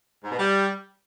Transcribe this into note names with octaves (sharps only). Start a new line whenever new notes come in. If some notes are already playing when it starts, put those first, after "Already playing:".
G#2
B2
G3